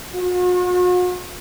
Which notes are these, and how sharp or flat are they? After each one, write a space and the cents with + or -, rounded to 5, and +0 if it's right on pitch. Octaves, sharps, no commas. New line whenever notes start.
F#4 -45